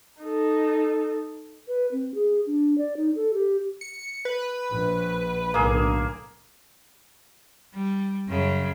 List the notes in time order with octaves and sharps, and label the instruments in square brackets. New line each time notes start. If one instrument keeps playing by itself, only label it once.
[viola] D#4 A4
[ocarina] B4
C4
G#4
D4
D5
D#4
A4
G4
[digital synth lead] C#7
B4
[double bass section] A#1
[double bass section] B1 A2 D3 [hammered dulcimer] A#3 G#4
[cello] G3
F#2 C#3